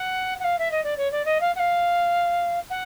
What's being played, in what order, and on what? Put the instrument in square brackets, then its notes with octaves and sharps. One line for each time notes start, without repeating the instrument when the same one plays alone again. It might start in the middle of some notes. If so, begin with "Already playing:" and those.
Already playing: [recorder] F#5
F#5
F5
E5
D#5
D5
C#5
D5
D#5
F5
F#5
F5
F#5